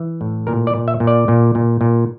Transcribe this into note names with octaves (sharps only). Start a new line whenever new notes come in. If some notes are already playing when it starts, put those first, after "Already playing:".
Already playing: E3
A2
A#2 A#4
D5
A#2
E5
A#2
D5
A#2
A#2
A#2